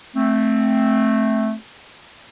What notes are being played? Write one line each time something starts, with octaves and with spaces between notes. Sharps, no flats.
A3 C4